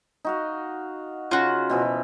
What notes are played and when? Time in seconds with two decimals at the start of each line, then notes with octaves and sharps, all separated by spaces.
0.25 D#4 F#4 F5
1.31 C#3 F4 F#4
1.70 B2 E3 F3